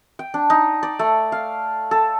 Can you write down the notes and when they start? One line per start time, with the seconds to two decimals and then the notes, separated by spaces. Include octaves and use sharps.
0.19 G5
0.34 D4
0.50 D#4
0.83 D5
0.99 A3
1.32 F5
1.91 A4